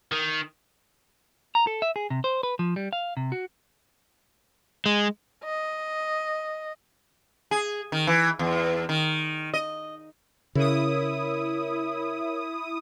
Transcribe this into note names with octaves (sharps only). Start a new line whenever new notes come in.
D#3
A#5
A4
E5
G#4
C3
C5
B4
F3
G3
F5
C3
F#4
G#3
D#5
G#4
D#3
E3
E2
D#3
D#5
C#3 E4 A#4 C#5 D#6